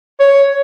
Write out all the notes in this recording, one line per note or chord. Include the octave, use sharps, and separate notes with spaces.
C#5